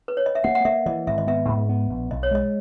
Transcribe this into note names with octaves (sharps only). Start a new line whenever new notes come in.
B4
C#5
D#5
E5
A#3 F#5
F#5
A#3 E5
E3 D#5
G#1 E5
D#5
B3 E5
G#2
B3
A#1
B1 D#5
C#5
G#3 D#5